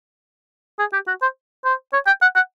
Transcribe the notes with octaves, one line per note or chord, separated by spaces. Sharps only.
G#4
G4
F#4
C5
C5
C#5
G5
F#5
F#5